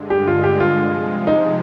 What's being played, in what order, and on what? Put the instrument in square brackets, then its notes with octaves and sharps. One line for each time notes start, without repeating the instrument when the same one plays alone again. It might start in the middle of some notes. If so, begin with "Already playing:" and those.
Already playing: [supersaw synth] G2 D3 G#3
[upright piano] G4
F4
G4
F4
[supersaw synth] C3 F3 G#3
[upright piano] D#4